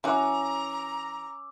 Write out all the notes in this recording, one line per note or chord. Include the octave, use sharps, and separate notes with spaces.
E3 C#4 F#4 A#5 D6 E6